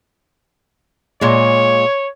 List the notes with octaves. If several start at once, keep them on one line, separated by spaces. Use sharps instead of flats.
A#2 G#3 C#5